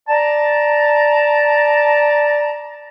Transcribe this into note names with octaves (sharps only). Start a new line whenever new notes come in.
D5 A5 A#5